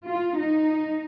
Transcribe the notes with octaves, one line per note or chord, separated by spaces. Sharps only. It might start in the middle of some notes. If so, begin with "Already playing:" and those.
F4
D#4